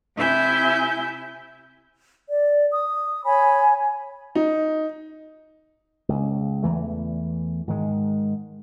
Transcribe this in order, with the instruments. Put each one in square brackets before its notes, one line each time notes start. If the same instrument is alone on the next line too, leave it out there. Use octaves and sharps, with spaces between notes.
[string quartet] C3 E4 E5 G#5 G6
[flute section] D5
D#6
C#5 G#5 B5
[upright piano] D#4
[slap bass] C#2
E2 E3 A3
G#2 D#3 G#3